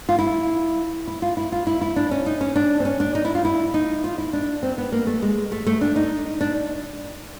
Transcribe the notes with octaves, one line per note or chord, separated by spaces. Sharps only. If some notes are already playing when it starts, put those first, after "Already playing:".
F4
E4
E4
F4
E4
F4
E4
E4
D4
C#4
D#4
C#4
D4
C4
C#4
D4
D#4
E4
F4
E4
D#4
F4
E4
D4
C4
B3
A#3
A3
G#3
A3
A3
D4
D#4
D4